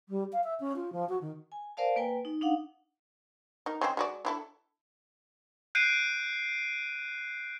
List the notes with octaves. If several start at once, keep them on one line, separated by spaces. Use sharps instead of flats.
G3
F5
E5
C#4
F4
F3
F#4
D#3
G#5
A#4 C5 D5 F5 A5
A#3 B4 G5 G#5
D#4
D4 D#4 F5 F#5
D#4 A#4
C#3 G#3 C4
G#3 F#4 D5
D4 E4 A4
F#6 G6 C7 D7 D#7